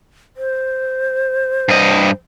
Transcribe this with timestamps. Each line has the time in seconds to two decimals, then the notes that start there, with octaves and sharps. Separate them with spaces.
0.37 C5
1.69 G2 D#5